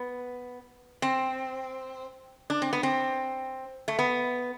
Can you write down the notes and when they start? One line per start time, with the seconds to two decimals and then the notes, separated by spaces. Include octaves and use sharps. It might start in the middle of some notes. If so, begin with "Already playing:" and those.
Already playing: B3
1.02 C4
2.50 D4
2.62 C4
2.73 B3
2.83 C4
3.88 A3
3.99 B3